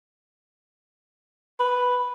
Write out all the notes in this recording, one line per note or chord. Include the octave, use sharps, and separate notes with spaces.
B4